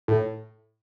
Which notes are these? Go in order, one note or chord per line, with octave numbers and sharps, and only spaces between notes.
A2